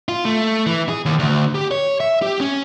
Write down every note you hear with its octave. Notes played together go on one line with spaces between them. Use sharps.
F4
A3
E3
G#4
D#2
D2
G4
C#5
E5
G4
C#4